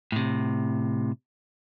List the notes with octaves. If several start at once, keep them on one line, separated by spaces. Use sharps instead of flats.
A2 C3